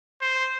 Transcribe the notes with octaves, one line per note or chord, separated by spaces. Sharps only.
C5